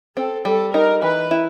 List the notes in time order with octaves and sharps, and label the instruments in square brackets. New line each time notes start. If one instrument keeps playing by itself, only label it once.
[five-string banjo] C4 [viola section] A4
[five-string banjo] G3 [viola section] A4
[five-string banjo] D#4 [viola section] A#4
[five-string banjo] E3 [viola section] B4
[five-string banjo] E4